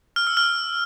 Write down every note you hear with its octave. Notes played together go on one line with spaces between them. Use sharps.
F6
E6
F6